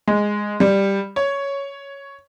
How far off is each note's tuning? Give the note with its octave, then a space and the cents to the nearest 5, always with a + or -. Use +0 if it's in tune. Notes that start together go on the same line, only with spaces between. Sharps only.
G#3 -5
G3 +5
C#5 +5